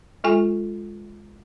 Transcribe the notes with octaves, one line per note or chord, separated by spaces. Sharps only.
G#3 F4 A4 G#5